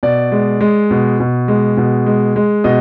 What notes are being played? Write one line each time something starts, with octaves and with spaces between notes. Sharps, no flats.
B2 D5
G#3
G#3
B2
B2
G#3
B2
G#3
G#3
B2 D#5